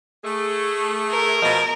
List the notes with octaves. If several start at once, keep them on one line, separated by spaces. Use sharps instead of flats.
A3 G#4
A#4
B2 F3 D#5